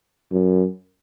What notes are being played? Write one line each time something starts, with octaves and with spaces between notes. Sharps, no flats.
F#2